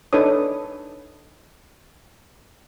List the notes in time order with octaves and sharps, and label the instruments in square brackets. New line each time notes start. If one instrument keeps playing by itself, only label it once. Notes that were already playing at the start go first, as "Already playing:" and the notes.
[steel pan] D4 D#4 A4 B4 C#5 D#6